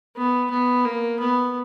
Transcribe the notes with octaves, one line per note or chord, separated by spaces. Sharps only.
B3
B3
A#3
B3